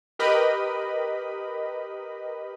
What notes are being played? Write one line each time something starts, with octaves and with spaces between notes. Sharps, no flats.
G4 A#4 B4 D#5 B5